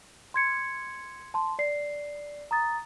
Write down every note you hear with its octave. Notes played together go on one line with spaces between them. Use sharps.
C6 G#6 C#7
A5 C6
D5 C7
A#5 D#6 A6